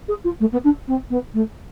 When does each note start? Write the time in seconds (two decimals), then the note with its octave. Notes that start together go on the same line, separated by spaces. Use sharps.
0.08 G#4
0.24 F4
0.40 A3
0.52 B3
0.64 D4
0.88 C4
1.10 B3
1.34 A3